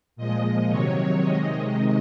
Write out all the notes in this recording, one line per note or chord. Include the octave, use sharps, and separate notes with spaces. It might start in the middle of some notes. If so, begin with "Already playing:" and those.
A#2 F3 G#3 D#5
C3 D#3 F#3 C#5
C3 D#3 G#3 D#5